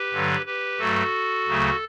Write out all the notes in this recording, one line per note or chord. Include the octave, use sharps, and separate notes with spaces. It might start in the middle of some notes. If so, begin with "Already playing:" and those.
Already playing: G4 B4
G2 D3 F#3
G4 B4
G2 F#3 A3 F#4 A4
D2 C#3 F#3 A3